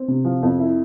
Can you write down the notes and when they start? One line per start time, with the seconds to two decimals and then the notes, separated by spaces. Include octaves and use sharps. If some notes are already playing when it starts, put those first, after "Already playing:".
Already playing: C4
0.08 C3
0.25 F3
0.43 F2
0.59 E4